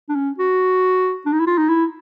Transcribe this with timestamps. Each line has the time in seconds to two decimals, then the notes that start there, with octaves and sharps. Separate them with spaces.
0.09 D4
0.15 C#4
0.38 F#4
1.26 D4
1.33 D#4
1.40 E4
1.47 F4
1.58 D#4
1.69 E4